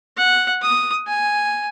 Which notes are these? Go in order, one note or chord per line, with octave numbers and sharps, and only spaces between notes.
F#5
D#6
G#5